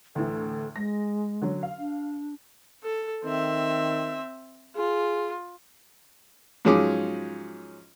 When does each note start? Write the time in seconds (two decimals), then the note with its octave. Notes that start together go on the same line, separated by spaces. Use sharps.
0.15 D2 A2 E3 A4
0.76 G#3 A#6
1.42 D3 F#3 C#4
1.63 F5
1.79 D4
2.84 A4
3.24 D#3 C4 E5
4.76 F4 G#4
6.65 G#2 F3 F#3 C#4 G#4 D6